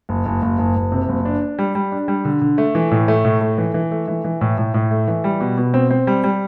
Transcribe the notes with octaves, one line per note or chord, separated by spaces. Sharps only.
F#1
F#1
F#1
F#1
F#1
C3
F#1
D4
D4
G3
G3
D4
G3
D3
D3
A3
E3
A2
A3
A2
A3
E3
E3
A3
E3
E3
A2
A2
A2
A3
E3
G3
B2
B2
C4
C4
G3
G3